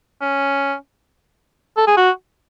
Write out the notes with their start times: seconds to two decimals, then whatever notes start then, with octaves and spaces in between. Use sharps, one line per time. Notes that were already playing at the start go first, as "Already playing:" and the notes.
0.22 C#4
1.77 A4
1.87 G#4
1.97 F#4